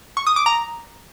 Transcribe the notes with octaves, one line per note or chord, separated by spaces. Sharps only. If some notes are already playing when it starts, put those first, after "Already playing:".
C#6
D#6
D6
A#5